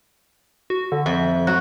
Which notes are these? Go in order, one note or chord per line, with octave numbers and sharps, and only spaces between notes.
F#4
D3
F2 E5
F#3 F#4